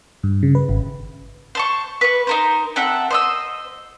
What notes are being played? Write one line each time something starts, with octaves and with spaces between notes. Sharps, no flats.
G2
C#3
B4
G#1
C5 A5 C#6
B4 C#6
D#4 A#4 C5
C4 A4 E5 F#5
C5 D#5 E6